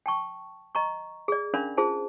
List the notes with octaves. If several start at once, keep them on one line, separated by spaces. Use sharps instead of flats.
G5 A5 C#6
D#5 A#5 C#6
G#4 D5
C#4 D4 A#4 D5 F5 B5
F4 G#4 C5 A5